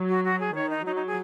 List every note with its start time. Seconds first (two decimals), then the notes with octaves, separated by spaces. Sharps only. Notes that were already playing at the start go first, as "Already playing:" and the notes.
Already playing: F#3
0.09 F#4
0.24 F#4
0.40 G#4
0.55 D#3 C#5
0.70 D#4
0.85 F#3 D#4
0.96 D#4
1.07 G#4